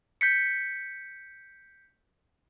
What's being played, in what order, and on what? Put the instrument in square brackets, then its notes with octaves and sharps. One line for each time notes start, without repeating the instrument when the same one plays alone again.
[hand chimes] G6 B6 C#7